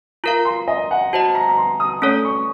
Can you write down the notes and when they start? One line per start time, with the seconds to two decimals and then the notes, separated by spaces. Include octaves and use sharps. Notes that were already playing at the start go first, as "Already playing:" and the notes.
0.24 F4 A#4 F5 A#5
0.45 C6
0.68 D#5
0.91 F#5
1.13 F#4 C5 D#5 A5
1.35 A#5
1.49 A#5
1.57 C6
1.80 D#6
2.02 A3 C#4 A4 C#5 D#6
2.25 C#6